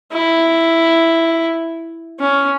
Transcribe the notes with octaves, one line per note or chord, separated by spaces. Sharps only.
E4
C#4